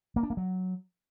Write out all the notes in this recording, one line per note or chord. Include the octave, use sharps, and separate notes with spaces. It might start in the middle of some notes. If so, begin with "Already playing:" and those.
A#3
D4
A#3
F#3